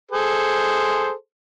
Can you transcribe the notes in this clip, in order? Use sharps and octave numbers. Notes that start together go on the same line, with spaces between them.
G#4 A4 C5